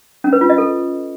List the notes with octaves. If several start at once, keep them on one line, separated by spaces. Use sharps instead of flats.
C#4
B4
F4
D#5
A4